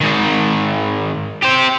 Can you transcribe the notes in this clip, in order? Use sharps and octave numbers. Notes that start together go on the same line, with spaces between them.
G#2 D#3
G4 C5